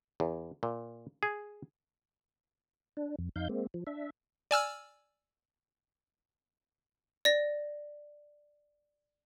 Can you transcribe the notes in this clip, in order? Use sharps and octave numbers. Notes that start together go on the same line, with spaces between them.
E2
A#2
G#4
D4
F2
F2 D#4 F5 G6
G#3 A#3 C4
F3
D4 E5
D5 G#5 E6 F6
D5 A#6